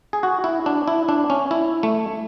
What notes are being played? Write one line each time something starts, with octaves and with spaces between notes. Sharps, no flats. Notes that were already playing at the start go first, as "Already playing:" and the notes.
G#4
F#4
E4
D4
E4
D4
C#4
E4
A3